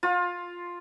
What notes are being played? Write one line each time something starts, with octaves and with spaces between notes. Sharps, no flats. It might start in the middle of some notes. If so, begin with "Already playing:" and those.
F4